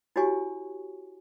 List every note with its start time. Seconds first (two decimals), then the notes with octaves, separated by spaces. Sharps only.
0.16 E4 F#4 G4 C#5 G#5 C#6